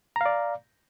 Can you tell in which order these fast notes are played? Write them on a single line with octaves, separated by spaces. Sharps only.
A#5 F5 D5